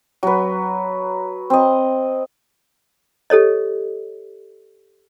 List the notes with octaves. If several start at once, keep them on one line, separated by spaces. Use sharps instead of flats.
F#3 B4
C4 D#5
G4 A4 C#5 D#5